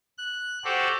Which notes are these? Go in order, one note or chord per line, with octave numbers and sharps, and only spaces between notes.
F#6
F#4 G4 A4 C5 D5